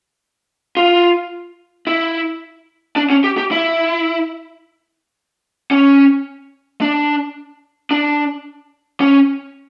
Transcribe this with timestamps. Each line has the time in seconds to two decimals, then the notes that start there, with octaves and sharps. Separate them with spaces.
0.77 F4
1.87 E4
2.96 D4
3.10 C#4
3.24 G4
3.38 G4
3.51 E4
5.71 C#4
6.81 D4
7.91 D4
9.01 C#4